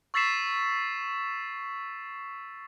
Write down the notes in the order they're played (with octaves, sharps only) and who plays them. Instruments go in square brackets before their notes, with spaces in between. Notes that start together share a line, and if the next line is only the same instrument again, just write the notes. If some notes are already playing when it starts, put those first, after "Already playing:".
[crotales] C#6 E6 A6 B6 C7 E7